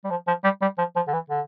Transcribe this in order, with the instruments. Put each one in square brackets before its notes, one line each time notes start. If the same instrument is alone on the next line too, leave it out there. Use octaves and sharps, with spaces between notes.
[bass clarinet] G3
F3
F3
G3
G3
F3
F3
D3
E3
D3